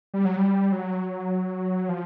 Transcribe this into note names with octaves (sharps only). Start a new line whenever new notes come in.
G3
F#3
G3
F#3
F3